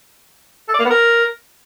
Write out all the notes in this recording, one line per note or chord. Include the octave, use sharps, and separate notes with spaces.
A4
D5
A#3
B3
A#4